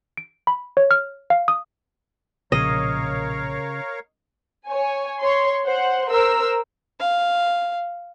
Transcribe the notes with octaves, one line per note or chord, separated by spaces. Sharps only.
D7
B5
C#5
F6
F5
D#6
B1 A#2 C#3 F3 A#4 C#5 D#5 F5
C#5 G#5
C#5 C6
C5 F#5
A#4 C5 E6
F5